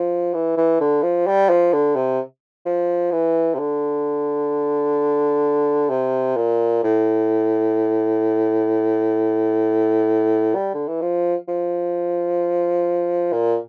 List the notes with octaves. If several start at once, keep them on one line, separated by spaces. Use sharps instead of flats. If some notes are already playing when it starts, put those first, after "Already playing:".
Already playing: F3
E3
E3
D3
F3
G3
F3
D3
C3
F3
E3
C3
D3
C3
A#2
A2
G3
D3
E3
F3
F3
A#2